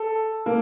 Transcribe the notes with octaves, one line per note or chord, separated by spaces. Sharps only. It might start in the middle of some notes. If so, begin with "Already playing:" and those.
Already playing: A4
A#3